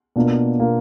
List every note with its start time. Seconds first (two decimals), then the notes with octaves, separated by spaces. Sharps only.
0.16 B2 A#3 D4 F4 A#4
0.59 B2 A#3 D4 F4 A#4